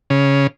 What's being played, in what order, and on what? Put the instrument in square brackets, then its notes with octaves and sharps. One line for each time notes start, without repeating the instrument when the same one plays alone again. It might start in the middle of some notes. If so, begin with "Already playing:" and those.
[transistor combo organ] C#3